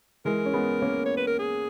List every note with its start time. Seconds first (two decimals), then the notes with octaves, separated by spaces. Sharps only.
0.25 E3 G#3 A#4
0.46 C#4
0.53 G#3 B3
0.81 A#3 C#4
1.06 C#5
1.17 B4
1.27 A#4
1.39 G#4